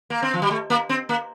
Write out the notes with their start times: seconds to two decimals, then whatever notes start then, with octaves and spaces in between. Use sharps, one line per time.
0.10 A#3
0.22 C4
0.34 F3
0.42 G3
0.51 A3
0.70 A#3
0.89 C4
1.09 A#3